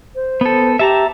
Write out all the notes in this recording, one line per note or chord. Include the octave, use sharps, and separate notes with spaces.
C5
B3 A4
G4 E5 A5 A#5